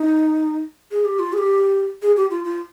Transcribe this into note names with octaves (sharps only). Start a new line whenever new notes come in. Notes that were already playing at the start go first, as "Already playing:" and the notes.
Already playing: D#4
G#4
G4
F4
G#4
G4
G#4
G4
F4
F4